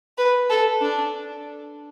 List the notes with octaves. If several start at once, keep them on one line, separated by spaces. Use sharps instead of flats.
B4
A4
D4